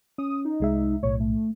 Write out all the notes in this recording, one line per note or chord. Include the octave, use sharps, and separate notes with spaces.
C#4 D#6
D#4
C2 G#3 E5
B1 A2 C#5
A3